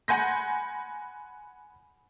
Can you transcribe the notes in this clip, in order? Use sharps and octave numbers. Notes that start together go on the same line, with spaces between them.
F#5 G#5 B5 C6 G6 A#6